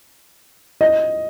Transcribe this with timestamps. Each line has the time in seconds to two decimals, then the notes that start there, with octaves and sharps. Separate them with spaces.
0.81 D#5